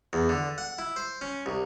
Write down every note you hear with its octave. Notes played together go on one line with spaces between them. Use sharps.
E2
D3
F#5
E4
C5
C#4
C2